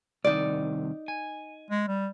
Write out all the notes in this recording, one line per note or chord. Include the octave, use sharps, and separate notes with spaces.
C2 D#3 D#4 D5
G#5
G#3
G3